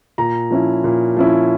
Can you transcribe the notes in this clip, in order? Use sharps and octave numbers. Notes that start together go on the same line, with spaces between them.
A#2 A#5
F3 C#4 E4
A#2
F3 C#4 E4